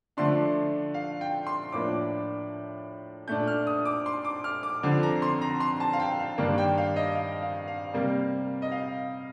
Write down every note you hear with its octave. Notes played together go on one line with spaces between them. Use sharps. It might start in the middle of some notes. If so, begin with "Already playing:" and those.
D3 F3 A3 D4 C6
F5
G5
C6
A2 F3 A#3 D4 D6
A#2 A3 D4 G6
F6
D#6
D6
C6
D6
F6
D6
F2 D3 F3 C4
A#5
C6
A#5
C6
A5
F5
G5
F5
G2 D#3 A#3 D4
G5
F5
D#5
F5
F5
F5
C3 G3 A#3
D#5
F5